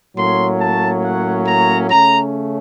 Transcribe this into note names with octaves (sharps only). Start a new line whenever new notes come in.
A2 F#3 A#3 C#4 C6
A5
F#5
A#5
C#3 A3 C#4 A#5